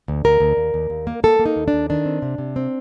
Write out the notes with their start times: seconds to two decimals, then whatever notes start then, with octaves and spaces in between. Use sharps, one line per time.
0.08 D2
0.25 D2 A#4
0.40 D2
0.57 D#2
0.74 D#2
0.90 D#2
1.07 A#3
1.24 A#3 A4
1.39 A#3
1.45 D#4
1.56 D#2
1.68 D4
1.73 D#2
1.90 D#3 D4
2.05 C4
2.22 C3
2.38 C3
2.56 C4